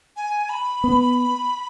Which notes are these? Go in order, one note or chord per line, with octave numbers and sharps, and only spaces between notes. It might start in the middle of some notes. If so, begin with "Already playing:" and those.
G#5
B5
B3